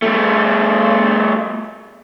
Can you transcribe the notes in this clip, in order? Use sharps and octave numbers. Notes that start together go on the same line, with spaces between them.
G3 A3